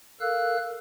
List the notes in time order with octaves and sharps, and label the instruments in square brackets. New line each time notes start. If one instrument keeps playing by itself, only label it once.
[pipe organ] A4 A#4 F5 E6 F#6